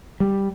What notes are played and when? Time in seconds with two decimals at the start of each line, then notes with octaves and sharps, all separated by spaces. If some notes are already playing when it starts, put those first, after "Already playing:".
0.20 G3